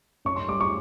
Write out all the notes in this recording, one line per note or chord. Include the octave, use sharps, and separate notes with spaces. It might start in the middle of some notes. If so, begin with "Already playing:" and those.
F#2 C#6
C6
G3 D6
C#6